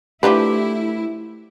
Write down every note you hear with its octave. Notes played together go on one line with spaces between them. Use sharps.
F3 A3 D4 E4 G4 B4